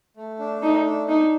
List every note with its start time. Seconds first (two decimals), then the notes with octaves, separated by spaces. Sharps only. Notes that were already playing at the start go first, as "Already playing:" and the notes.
0.17 A3
0.39 D4
0.62 A3 D#4
0.85 D4
1.08 D4 D#4